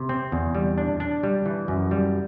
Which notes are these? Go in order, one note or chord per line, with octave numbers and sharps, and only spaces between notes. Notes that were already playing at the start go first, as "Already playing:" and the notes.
Already playing: C3
C4
E2
G3
D4
D4
G3
E3
F#2
G3